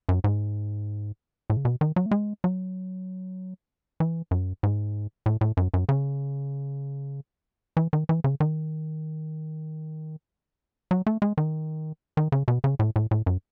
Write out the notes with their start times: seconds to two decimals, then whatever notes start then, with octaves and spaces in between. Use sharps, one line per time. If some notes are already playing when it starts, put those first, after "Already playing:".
0.09 F#2
0.24 G#2
1.50 A2
1.57 C#3
1.65 B2
1.81 D#3
1.96 F#3
2.06 A3
2.11 G#3
2.44 F#3
4.00 E3
4.31 F#2
4.63 G#2
5.26 A2
5.41 A2
5.57 F#2
5.74 F#2
5.89 C#3
7.77 E3
7.93 D#3
8.09 E3
8.24 C#3
8.40 D#3
10.91 F#3
11.07 A3
11.22 G#3
11.38 D#3
12.17 D#3
12.32 C#3
12.48 B2
12.64 C#3
12.79 A2
12.96 A2
13.11 A2
13.26 F#2